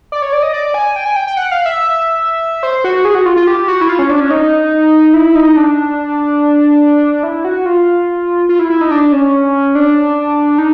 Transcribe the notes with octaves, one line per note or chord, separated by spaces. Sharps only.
D5
C#5
D5
D#5
D5
G#5
G5
G#5
G5
G5
F#5
F5
E5
C5
F#4
G#4
F#4
F4
F4
G4
F#4
E4
F4
C#4
D4
C#4
D#4
E4
D#4
D4
E4
F#4
F4
F4
E4
E4
D#4
D4
C#4
D4
D#4